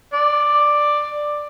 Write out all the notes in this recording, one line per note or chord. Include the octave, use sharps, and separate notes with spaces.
D5